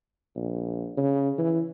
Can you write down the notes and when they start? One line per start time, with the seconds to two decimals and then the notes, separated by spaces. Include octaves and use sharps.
0.36 A#1
0.97 C#3
1.38 E3